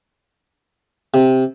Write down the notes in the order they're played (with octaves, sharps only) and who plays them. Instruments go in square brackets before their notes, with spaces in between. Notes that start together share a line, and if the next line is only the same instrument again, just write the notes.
[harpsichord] C3